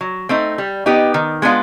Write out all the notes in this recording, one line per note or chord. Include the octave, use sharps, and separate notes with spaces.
F#3
A3 C4 D#4
G3
B3 D#4 G4
D#3
G#3 B3 D4 F4